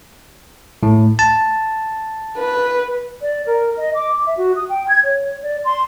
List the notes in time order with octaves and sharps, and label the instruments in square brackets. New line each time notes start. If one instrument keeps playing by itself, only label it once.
[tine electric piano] A2
A5
[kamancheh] B4
[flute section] D5
A#4
D#5
D6
E5
F#4
D#6
G5
G#6
C#5
D5
C6